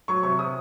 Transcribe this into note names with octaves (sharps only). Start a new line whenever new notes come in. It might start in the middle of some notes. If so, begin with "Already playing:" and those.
F#3 C#6
C3 C#6
C3 D#6